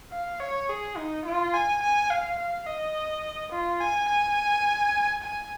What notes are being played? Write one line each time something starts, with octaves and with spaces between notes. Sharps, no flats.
F5
C#5
G#4
D#4
F4
G#5
G#5
F5
F5
D#5
F4
G#5
G#5
G#5